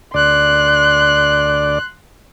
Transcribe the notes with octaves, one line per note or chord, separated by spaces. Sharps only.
D2 D5 C6 F#6